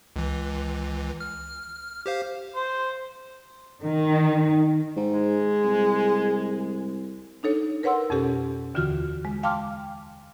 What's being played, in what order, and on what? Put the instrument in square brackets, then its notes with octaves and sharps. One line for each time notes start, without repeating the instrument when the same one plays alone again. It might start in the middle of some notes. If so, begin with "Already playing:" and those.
[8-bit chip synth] C#2 E3
F6
G4 C5 F5
[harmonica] C5
[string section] D#3
[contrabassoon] G#2
[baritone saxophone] G#3
[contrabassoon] C2
[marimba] D4 D#4 A4 C#5
A#4 B4 C#5 F#5 C6 E6
F2 B2 C#4 G4 A4
D#2 D3 E3 F4 F#4 F6
G#3
F5 G5 A5 C6 D6 F6